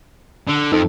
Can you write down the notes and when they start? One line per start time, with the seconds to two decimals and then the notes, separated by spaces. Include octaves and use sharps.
0.48 D3
0.72 F2 D#4 A4